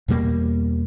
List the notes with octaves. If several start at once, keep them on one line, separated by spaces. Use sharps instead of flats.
E2 B2 G3 A#3